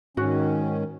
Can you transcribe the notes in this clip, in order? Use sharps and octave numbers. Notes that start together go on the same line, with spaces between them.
G#2 D#3 C#4 F#4